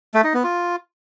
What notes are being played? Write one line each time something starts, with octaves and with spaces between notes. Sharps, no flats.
A3
D#4
B3
F4